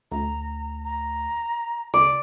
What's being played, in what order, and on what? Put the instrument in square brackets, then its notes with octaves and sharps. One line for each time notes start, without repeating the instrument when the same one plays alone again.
[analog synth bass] D2 [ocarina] A#5
[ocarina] A#5
[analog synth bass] C#2 [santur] D5